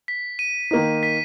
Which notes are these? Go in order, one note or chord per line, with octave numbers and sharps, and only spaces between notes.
B6
D#7
D#3 A#3 D#4
B6